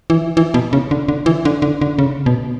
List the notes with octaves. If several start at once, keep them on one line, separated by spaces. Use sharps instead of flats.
E3
E3
B2
C#3
D3
D3
E3
D3
D3
D3
C#3
B2